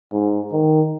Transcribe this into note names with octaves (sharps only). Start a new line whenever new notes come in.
G#2
D#3